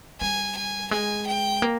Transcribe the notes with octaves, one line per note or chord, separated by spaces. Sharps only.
G3 G#5
G#5
G#3 G#5
G5
A#3